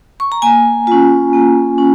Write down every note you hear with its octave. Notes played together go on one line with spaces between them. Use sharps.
C#6
A#5
A#3 G#5
C#4 F4
A#3
C#4